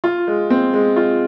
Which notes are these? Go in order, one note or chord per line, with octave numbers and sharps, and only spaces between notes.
F4
G#3
C4
G#3
F4